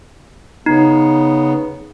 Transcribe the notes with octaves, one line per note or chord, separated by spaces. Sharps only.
C#3 B3 D#4